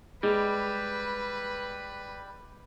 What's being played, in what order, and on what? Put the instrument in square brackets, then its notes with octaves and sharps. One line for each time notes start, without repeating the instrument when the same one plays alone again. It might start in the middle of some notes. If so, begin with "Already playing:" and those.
[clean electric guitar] G3 [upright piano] G#3 [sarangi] B4